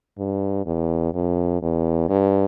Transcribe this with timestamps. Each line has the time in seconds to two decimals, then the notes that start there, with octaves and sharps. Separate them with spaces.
0.18 G2
0.66 E2
1.14 F2
1.62 E2
2.09 G2